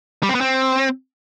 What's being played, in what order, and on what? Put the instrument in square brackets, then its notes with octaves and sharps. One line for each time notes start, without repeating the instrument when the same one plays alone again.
[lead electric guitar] G3
C4
B3
C4